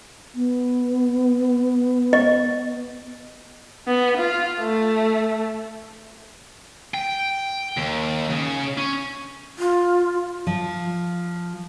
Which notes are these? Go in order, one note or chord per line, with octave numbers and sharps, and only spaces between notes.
B3
D#5
B3
F4
A3
G5
D#2
C#3
C#4
F4
F3